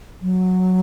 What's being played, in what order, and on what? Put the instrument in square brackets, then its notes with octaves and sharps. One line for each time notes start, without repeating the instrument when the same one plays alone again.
[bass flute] F#3